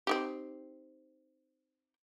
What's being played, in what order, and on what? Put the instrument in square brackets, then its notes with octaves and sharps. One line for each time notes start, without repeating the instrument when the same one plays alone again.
[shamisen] C4 D#4 G4